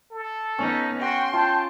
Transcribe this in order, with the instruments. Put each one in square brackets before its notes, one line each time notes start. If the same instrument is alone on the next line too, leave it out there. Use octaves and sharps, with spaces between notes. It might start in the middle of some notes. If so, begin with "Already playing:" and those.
[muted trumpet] A4
[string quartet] B3 D#4 [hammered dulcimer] C#4
[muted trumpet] F#4 [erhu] G5 [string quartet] C6
[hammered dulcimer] F4 [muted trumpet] G5 [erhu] A5